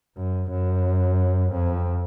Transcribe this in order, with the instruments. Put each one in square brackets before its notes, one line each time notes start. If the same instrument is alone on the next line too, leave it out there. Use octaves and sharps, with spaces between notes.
[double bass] F#2
F#2
F2